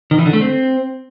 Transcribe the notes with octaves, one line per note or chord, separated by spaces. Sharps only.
D#3
E3
D3
A3
C4